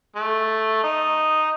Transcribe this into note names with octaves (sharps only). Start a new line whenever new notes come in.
A3
D#4